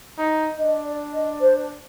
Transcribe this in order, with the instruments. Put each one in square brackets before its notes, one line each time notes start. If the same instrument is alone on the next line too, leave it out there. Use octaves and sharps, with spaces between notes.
[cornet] D#4
[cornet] D4 [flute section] D#5
[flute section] D5
D#5
C5